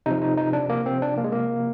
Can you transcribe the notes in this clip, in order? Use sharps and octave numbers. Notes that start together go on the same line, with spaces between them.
C3 F3 D#4
D#4
D#4
D4
A#3
C4
D4
A#3
G#3
A#3